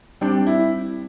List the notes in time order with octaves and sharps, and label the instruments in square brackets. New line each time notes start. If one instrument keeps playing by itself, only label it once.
[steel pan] G3 C4 G4 D5 G5 [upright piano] D4
[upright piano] E4